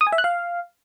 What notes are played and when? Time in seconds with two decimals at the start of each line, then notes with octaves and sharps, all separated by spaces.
0.01 D#6
0.07 G#5
0.12 E5
0.18 F#6
0.24 F5